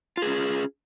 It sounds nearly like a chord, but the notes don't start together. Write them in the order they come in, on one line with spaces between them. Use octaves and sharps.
F4 G#4 C#4